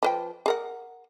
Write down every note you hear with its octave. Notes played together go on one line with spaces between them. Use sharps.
F3 B4 G5
G#4 A#4 F#5